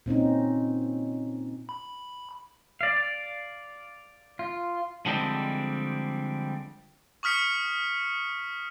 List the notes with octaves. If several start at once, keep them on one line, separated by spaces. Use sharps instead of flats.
A#2 C4 C#4 D#4
B5
D5 F5
F4
D3 F3 G3 G#3 C4 D4
C#6 D#6 F6 B6 C#7